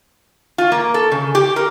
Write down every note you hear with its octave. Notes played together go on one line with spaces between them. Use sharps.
F4
A#3
A4
C#3
G4
A#4